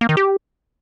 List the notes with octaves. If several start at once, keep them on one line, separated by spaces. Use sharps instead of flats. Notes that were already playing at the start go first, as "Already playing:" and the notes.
A#3
D#3
G4